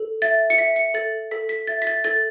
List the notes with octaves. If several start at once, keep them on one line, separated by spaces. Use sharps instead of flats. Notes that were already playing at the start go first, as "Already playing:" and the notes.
Already playing: A4
E5 A6
C#7
E5 B6
C#7
A4 A6
A4 B6
B6
E5 A6
B6
A6
A4 A6